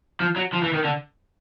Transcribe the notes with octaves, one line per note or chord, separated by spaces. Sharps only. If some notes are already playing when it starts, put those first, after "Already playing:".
F3
F#3
F3
E3
D#3
D3